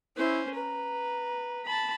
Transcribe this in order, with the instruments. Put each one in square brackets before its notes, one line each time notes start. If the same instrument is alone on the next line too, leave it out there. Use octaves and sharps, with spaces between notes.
[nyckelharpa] C#4 C5 [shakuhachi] E4
[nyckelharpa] B4 [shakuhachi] A#5
[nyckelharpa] A5 B5